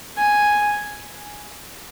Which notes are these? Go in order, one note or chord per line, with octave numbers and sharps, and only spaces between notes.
G#5